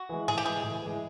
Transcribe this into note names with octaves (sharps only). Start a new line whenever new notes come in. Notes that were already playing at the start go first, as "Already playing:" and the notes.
Already playing: F#4
E3 G#3
A2 G#4
G4
E3 G#3 G#4
A2
E3 G#3